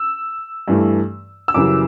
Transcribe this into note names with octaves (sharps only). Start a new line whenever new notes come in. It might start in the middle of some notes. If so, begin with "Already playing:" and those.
Already playing: E6
G2 E3 A3
E6
F#2 C#3 E3 G3 D6